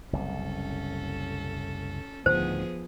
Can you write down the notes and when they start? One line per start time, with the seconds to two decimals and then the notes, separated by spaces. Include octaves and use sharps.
0.13 F#1 C2 C#4 A4
2.26 D2 A2 D#3 F3 B3 G#4 C5